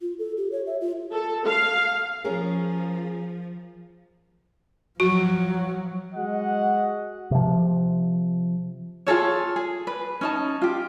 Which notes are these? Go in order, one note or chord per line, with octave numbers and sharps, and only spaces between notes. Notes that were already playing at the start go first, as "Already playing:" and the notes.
F4
A4
G4
C#5
E5
F4
A4
F5
F3 C#4 G#4 A#4
F3 F#3 F#4
G#3 F#4 D#5 F#5
C3 F3
F4 G#4 A4 C#5
G#4
B4
C#4 D#4 A5
F4 G4